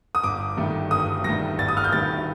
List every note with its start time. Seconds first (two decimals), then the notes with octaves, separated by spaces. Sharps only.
0.15 D#6
0.23 G1 D6
0.57 G2 D#3 A3
0.91 G1 D#6
1.24 G2 D#3 A3 A#6
1.58 G1 A6
1.68 D#6
1.77 F6
1.84 G6
1.92 G2 D#3 A3 A6